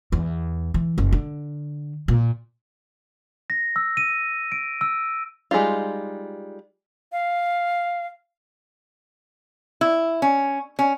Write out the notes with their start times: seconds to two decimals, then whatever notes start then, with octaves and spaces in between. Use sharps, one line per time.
0.12 E2
0.74 E3
0.98 F#1
1.12 D3
2.08 A#2
3.50 A#6
3.76 E6
3.97 D#7
4.52 D7
4.81 E6
5.51 G3 G#3 C#4 D#4 F4
7.12 F5
9.81 E4
10.22 C#4
10.79 C#4